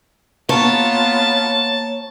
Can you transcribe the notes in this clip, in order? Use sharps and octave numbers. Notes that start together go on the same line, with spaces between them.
A#3 B3 F4 C#5 A5